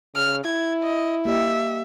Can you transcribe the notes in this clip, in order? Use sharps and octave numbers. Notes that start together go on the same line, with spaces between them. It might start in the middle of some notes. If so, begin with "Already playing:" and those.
C#3 F6
E4 G#6
D#5
A#3 G4 D#5 E5